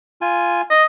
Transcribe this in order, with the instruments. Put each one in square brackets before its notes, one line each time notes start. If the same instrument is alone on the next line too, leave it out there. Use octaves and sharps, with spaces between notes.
[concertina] F4 G#5
[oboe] D#5